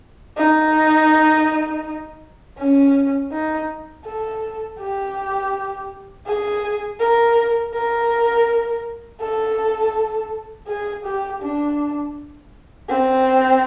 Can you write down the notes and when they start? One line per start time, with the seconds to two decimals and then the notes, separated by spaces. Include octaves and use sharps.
0.37 D#4
2.58 C#4
3.32 D#4
4.04 A4
4.79 G4
6.26 G#4
6.99 A#4
7.73 A#4
9.21 A4
10.67 G#4
11.04 G4
11.42 D4
12.88 C4